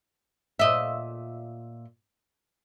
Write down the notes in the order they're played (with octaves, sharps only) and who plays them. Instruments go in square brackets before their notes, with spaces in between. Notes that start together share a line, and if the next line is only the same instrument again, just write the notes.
[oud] A#2 D#5 E5